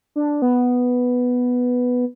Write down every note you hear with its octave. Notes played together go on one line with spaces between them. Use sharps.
D4
B3